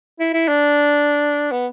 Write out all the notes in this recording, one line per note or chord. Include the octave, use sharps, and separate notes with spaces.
E4
E4
D4
B3